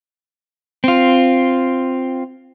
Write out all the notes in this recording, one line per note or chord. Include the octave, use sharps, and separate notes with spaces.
C4 F4